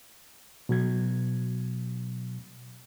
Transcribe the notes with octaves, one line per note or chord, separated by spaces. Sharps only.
B2 F#3 G#6